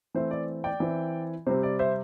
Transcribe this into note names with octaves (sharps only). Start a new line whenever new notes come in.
E3 A3 C4 E4 C5
D5
D5 G5
E3 C4 E4
C3 G3 C4 C5
D5
C5 E5